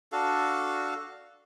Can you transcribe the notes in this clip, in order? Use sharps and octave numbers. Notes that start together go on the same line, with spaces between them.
D4 F#4 A4 F5